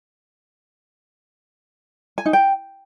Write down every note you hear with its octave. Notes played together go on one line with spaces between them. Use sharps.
G#5
D#4
G5